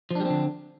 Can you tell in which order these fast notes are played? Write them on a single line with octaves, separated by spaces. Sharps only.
F3 D4 G3 C4 D3